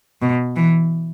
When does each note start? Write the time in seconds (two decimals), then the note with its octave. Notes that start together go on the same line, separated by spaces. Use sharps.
0.22 B2
0.56 E3